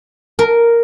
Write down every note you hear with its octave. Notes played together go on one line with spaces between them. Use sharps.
A#4